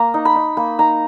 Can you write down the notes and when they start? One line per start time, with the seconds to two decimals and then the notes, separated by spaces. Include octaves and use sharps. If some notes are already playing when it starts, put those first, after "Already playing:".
Already playing: A#3 A#5
0.14 D#4
0.25 B5
0.36 D#4
0.57 A#3 B5
0.79 D#4 A#5